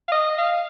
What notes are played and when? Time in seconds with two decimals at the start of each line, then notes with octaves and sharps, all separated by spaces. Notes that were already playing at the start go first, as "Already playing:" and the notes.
0.08 F5
0.12 D#5
0.38 F5